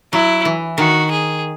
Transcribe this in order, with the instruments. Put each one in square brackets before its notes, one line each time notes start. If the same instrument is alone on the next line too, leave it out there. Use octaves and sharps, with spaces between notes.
[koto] F#3 [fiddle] E4
[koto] E3
[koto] D#3 [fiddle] F#4
[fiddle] G#4